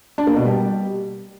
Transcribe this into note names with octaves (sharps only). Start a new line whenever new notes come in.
D4
A#3
B2
G3